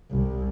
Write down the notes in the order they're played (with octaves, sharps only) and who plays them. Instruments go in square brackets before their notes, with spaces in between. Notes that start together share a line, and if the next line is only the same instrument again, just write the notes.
[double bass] C2